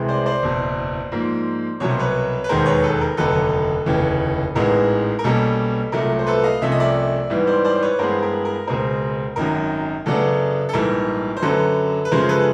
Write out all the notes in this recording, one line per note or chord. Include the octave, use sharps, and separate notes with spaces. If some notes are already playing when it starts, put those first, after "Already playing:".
Already playing: C2 C3 E3 G#3 C4
C5 D5
C5 D5
F#1 E2 B2
G#2 F3 A#3
C2 B2 F#3 C#5
C5
B4 C#5
B4
E1 D#2 D#3 G#3 B3 A#4 C5
B4 C#5
A4 B4
A#4
F1 D#2 D3 F#3 B3 A4 B4
F1 D#2 C#3 E3
A1 G#2 E3 G#3 B3 A#4
A#4
B1 B2 G3 A#3 C#4 A4
C2 A#2 F#3 A3 A#4
C5
A4 B4
D#5 F5
C2 C3 F3 A3 C#4 E5
D#5
D5 E5
G#2 E3 G3 B3
C5 D5
C5 D5
C5
B4 C#5
G2 E3 G#3 B3 A#4 C5
A#4
A#4
C#2 B2 G#3 C4 A#4
G#1 F#2 D#3 F#3 A#4
F#2 C#3 F#3 B3 D4 A4
A4
A#1 G#2 E3 G3 A#4
C5
F#2 D3 F#3 A4 B4
B4
F#2 C#3 F3 G#3 A#4 C5
A4 B4